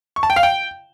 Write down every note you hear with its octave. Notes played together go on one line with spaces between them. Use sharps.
C#6
A5
G5
F5
G5